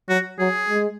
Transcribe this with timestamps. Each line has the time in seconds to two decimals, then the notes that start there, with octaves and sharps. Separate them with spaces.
0.08 F#3 F#4
0.39 F#3 G#4
0.69 G#3